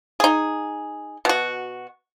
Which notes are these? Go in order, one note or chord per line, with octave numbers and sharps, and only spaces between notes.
D#4 G#4
B2 F#4